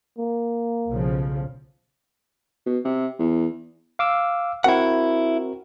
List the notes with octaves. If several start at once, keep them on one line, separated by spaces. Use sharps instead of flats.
A#3
B1 C#3 F3
B2
C3
E2
F5 D6 E6
C4 E4 F#4 A#4 F#5